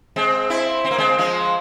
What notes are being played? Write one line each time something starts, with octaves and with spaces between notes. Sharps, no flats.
G#3 C4
C4 E4
C4
A#3
G#3 C4
F3 G#3